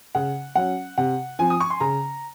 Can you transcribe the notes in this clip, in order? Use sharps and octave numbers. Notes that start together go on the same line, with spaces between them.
C#3 F#5
F#3 C#4 F#5
C3 F#5
F3 C4 G#5
D#6
C#6
C6
C#3 A#5